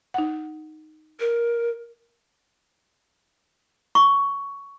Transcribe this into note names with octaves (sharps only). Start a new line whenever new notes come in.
D#4 F#5
A#4
C#6